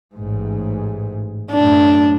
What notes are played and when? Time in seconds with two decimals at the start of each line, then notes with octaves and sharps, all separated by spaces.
0.15 A1 G#2
1.52 F#2 A2 D4